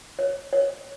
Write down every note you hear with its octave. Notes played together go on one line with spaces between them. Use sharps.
C#5
C#5